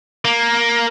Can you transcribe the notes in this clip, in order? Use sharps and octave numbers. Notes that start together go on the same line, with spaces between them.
A#3